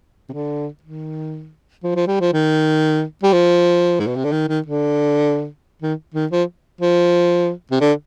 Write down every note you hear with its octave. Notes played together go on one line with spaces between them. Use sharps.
C3
D3
D#3
F3
F3
G3
F3
D#3
G3
F3
G#2
B2
C3
D3
D#3
D#3
D3
D#3
D#3
F3
F3
C3
D3